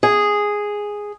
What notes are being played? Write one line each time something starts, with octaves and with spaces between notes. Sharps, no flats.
G#4